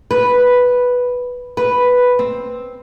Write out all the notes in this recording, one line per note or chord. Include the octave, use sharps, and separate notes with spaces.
B4
B4
C4